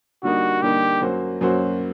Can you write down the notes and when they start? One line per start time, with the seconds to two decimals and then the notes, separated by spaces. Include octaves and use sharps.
0.23 D3 G3 A#3 D#4 F#4
0.62 D3 G3 A#3 D#4 G4
1.02 F#2 F#3 A#3 F#4 C5
1.41 F#2 F#3 A#3 F#4 C5